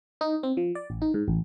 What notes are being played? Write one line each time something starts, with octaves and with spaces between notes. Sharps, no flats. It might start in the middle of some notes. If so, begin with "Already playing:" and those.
D#4
C4
F3
D5
A1
D#4
G#2
A1